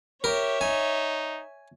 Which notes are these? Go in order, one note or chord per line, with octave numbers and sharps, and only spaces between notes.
G4 A#4 C#5 E5
D#4 G#5